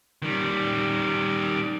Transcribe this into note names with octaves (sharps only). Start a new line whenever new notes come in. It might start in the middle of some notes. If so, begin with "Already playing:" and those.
D#3 G3